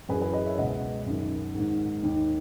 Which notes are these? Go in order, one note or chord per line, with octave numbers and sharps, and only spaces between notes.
F#2 E3 G#4 B4
G#4 B4
B4 D#5
C#5 E5
C#2 B2 D#5 F#5
F#2 D#3
G#2 D#3
D#2 D#3